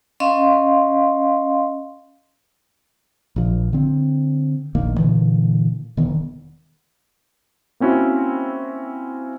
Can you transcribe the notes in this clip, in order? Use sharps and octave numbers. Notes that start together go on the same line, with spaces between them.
C#4 D#5 F5 C6
A#1 F3
D3 C4
E1 A#1 D#3 A#3
A#2 D3 E3 A#3
E1 D#3 B3
A#3 C4 C#4 E4 F#4